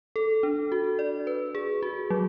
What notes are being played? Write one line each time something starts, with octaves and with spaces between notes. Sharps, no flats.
A4
D4
F#4
D5
B4
G#4
F#4
F#3